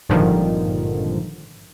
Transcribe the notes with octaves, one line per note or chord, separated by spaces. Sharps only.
G#1 G2 A#2 D3 D#3 F3